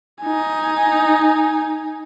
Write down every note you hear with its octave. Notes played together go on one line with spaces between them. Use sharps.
D#4 G#5